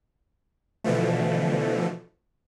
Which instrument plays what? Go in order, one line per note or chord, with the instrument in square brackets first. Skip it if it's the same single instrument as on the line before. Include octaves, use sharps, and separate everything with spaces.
[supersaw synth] B2 D3 E3 F3 A3